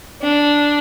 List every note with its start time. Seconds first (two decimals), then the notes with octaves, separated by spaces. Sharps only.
0.23 D4